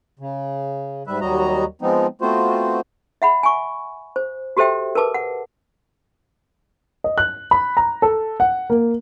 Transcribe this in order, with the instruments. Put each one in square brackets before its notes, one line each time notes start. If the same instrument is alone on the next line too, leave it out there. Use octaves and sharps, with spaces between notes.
[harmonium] C#3
G#2 G3 B4 E5
D#2 F#3 G3 F#4 D#5 A#5
F3 G#3 B3 C4 D#4
A3 B3 C4 F4 F#4 C5
[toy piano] E5 F#5 B5
G#5 C#6
C5
F#4 G4 A4 C5 E5 G5
A#4 B4 A5 D6
F#5
[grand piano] D#5
F#6
B5
A#5
A4
F#5
A#3